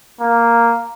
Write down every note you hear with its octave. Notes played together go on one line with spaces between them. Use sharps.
A#3